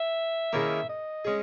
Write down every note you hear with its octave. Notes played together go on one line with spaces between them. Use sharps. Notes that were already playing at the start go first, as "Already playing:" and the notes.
Already playing: E5
D#3 A#3 C#4 E4 G#4
D#5
G#3 C#4 G#4